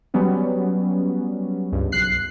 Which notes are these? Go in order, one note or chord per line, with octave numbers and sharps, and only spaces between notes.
F#3 G3 B3 C#4
C#2 G2
B1 F#6 C7